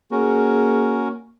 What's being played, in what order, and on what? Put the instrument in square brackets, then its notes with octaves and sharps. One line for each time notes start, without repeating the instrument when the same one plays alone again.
[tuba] A#3 [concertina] C#4 F#4 A#4 [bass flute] G#4